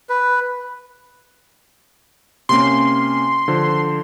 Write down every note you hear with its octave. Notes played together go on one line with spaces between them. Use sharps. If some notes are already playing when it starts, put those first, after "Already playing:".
B4
C3 A#3 C#4 C6
D3 F3 C5